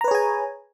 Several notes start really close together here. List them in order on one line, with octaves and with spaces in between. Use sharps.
A#5 B4 C#5 G#4 G#5